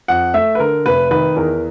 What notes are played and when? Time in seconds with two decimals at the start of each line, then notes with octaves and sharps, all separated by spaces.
0.08 F2 F#5
0.34 A3 E5
0.55 B4
0.60 D3 A#4
0.86 F1 B4
1.11 D#3 B4
1.36 E2 A#4